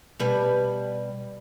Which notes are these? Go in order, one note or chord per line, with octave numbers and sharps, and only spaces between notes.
B2 G3 B4